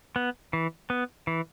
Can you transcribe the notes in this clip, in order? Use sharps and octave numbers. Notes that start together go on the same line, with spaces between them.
B3
E3
B3
E3